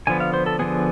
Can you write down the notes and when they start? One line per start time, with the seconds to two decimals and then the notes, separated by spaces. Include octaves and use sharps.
0.07 D3 F3 B3 G#5
0.20 F5
0.33 C5
0.46 A4
0.59 D3 F3 B3 G#4